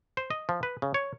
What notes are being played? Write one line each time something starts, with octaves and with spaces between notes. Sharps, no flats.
C5
D#5
F3
B4
C#3
C#5